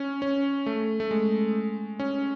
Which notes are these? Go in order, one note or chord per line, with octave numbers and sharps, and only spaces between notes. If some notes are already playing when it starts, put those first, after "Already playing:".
Already playing: C#4
C#4
A3
A3
G#3
C#4